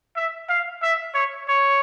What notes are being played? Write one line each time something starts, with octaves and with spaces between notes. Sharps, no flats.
E5
F5
E5
C#5
C#5